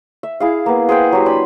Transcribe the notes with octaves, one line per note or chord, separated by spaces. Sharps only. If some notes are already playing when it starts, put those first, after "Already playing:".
E5
E4 G#4 F5
A#3 B3
G#4 C5 F#5 G5
F#3 G4
D4 G#5 B5 C6